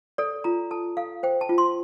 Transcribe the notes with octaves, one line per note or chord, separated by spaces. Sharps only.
A4 D5
F4 A#5
A4 A5
A4 F5
C5 G5
A5
F4
C6